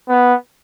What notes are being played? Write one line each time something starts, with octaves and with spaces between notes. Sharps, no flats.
B3